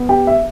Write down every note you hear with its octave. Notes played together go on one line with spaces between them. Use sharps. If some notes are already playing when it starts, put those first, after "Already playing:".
Already playing: B3
G4 G5
E5